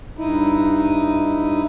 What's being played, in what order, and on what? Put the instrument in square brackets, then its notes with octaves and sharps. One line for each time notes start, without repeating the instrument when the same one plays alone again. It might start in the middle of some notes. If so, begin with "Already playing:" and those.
[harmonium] G2 D#4 E4